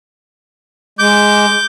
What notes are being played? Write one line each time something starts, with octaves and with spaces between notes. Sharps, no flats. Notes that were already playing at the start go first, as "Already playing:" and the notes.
G#3 D6 G6